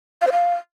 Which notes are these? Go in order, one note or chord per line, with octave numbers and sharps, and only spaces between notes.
F5
C5
F5